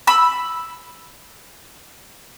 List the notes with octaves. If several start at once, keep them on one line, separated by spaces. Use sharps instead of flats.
B5 E6